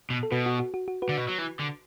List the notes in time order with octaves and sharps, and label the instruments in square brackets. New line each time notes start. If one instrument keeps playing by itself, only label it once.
[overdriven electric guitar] B2
[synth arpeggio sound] A4
[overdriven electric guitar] B2 [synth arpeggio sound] F#4 B4
[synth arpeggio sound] F#4
F#4
F#4
F#4
F#4 B4
[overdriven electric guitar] D3
B2
F#3
E3
D3